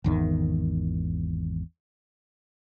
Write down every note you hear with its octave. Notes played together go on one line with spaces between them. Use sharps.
G#1 E2 D#3